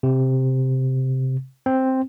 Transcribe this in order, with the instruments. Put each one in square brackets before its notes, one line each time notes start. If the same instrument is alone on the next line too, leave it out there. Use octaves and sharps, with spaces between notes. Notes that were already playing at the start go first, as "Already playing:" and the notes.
[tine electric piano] C3
C4